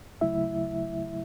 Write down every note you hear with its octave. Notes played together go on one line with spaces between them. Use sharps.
D2 C#3 F#3 A3 E4 E5